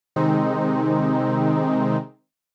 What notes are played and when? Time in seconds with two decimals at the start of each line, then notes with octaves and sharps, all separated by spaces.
0.16 C3 D#3 G#3 C4 D#4